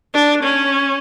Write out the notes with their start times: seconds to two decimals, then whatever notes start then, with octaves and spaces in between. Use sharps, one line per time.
0.14 D4
0.43 C#4